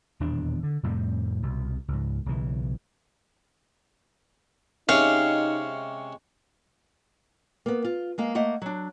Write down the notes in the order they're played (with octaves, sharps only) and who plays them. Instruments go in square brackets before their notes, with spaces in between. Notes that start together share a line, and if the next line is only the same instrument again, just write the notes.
[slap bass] D#1 E2 B2 D4
D3
F2 A2 C3 G3
C2 B2
C#2 G#2
B1 C#3 E3
[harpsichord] C3 G#3 C#4 [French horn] D#4 [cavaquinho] F5
[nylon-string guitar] A#3 B3
F4
G#3 A#3 F5
A3 A#3 D#5 F#5
F#3 D4